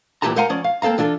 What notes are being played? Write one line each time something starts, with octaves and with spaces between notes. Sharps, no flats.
B1 A#2 E3 G4 A5 A#5
A#4 C5 F5 F#5 G#5 A#5
F3 C#4 D5
F5
A#3 C4 A4 F5 A#5
E3 D4 F4 A4